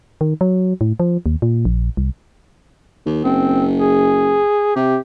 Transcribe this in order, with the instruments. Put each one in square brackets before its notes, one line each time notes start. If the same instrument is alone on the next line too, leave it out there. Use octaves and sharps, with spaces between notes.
[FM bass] D#3
F#3
A2
F3
D#2
A#2
A#1
C2
[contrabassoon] D#2
[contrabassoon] F#1 [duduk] C4
[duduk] G#4
[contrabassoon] C3 [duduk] G4